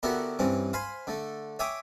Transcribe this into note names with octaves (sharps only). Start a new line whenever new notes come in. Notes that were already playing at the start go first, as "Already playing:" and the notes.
D3 B3 E4 F#4 G4 A#4
G2 E3 C4 C#4
C5 F5 G#5 B5 C6
D3 A3
C#5 E5 G5 G#5 D6 D#6